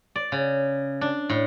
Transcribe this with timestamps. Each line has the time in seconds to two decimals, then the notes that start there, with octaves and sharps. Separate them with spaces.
0.16 D5
0.32 C#3
1.01 D4
1.29 A2